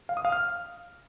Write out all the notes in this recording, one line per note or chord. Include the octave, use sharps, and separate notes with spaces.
F5
D#6
F5
F6